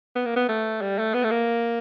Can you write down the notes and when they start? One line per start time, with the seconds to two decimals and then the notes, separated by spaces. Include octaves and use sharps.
0.16 B3
0.26 A#3
0.36 B3
0.49 A3
0.81 G3
0.98 A3
1.14 B3
1.24 A3
1.31 A#3